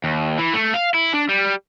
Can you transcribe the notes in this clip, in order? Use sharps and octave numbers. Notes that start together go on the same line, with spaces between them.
D#2
E3
A3
F5
E4
D4
G3